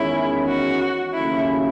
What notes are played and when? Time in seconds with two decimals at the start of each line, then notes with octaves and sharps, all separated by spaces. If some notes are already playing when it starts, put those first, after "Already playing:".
Already playing: E2 D#3 G#3 C#4 E4
0.46 F#4
1.14 D#2 C#3 F#3 A3 C#4 E4